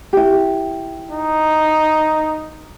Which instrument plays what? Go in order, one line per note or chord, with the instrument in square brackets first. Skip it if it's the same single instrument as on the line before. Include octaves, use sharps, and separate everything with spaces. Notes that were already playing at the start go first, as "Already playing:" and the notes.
[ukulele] E4 G4
[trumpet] D#4